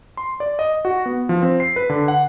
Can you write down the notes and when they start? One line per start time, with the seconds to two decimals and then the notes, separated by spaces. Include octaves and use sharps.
0.17 C6
0.40 D5
0.59 D#5
0.85 F#4
1.06 B3
1.29 F3
1.42 C4
1.60 C7
1.76 B4
1.90 D3
2.08 F#5